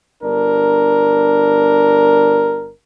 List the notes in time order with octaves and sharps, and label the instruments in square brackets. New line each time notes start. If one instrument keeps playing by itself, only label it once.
[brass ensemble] G1 D4 A#4